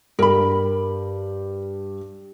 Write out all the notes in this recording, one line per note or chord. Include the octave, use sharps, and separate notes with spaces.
G2 G4 A#4 B5